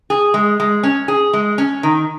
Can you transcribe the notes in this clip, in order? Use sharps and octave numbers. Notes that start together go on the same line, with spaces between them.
G#4
G#3
G#3
C#4
G#4
G#3
C#4
D#3